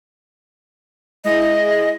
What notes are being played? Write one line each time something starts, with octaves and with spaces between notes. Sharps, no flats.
G#3 E4 G#4 D#5